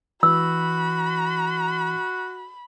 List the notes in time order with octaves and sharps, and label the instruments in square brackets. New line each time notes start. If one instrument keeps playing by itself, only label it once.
[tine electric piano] E3 [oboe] F#4 [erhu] B5 [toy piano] E6